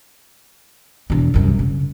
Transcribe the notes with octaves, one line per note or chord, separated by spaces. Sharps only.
E1 E2
C2 F#2
C#3